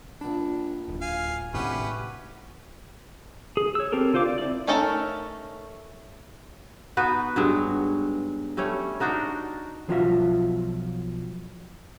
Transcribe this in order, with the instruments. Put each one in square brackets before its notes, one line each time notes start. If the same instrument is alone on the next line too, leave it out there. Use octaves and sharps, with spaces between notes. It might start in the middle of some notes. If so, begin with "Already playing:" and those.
[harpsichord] A#1 B5 [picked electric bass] D4
[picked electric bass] D1
[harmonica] F5 G#5
[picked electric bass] G#1 A2 C3 [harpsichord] D2 F#5 [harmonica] C#4 G4 B4
[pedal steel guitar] G#4
C#5 E6
C4 G4 A4 A#4
D3 F4 C5 F5 D6
D5
C4 E4 D5
[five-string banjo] A3 C#4 D#4 A4 A#4
[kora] B3 D#4 F#4 B4
G2 F#3 G#3
G3 A3 C#4 C#5
D4 D#4 F#4 A#4
[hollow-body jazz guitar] B1 F3 F#3 F4 F#4 E5